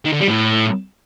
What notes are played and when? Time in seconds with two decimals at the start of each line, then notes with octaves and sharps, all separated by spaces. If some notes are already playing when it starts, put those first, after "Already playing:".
0.05 D#3
0.13 D3
0.20 G3
0.28 A2